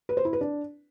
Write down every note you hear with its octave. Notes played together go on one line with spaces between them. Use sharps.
B4
C5
E4
B4
D4